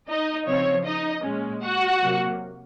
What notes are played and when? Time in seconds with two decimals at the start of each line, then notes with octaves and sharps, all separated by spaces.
0.09 D#4 D#5
0.47 C#3 F3 C4 C#5
0.85 D#4 D#5
1.24 A#2 G#3 C#4
1.62 F#4 F#5
2.00 C3 F#3 A#3